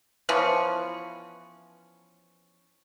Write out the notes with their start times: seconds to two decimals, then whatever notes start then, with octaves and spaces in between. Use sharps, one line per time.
0.29 E3 F3 B3 C#4